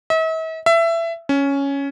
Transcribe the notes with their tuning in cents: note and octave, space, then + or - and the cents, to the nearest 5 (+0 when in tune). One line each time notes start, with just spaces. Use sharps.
E5 -45
E5 +20
C#4 +5